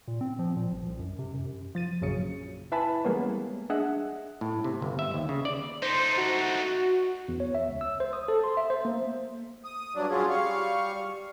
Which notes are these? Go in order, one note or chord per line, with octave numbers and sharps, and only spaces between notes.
A#2
C4
F3
A#2
A1
C2
F#2
C3
F#2
F3 A6 D#7
A#1 F#2 C#3 C#7
E4 B4 E5 G#5 A5 B5
E3 G3 G#3 A#3 B3 C#4
D4 G#4 D#5 E5 F#5
A2
C3
G1
E5
D#2
C#3
D5
A3 D#4 C5
F#4
E2
C#5
E5
C#2
E6
C5
D#6
A4
C6
E5
C5
A#3
D#6
G2 F#3 D4
F#3 C#4 F4 G#4
G3 F5 C#6